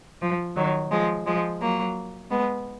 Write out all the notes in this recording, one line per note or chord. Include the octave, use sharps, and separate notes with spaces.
F3
D#3 F#3
F3 G#3
F3 G#3
F#3 A#3
G#3 B3